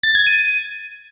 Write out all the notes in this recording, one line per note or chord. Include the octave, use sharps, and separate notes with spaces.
A6
G#6
D#7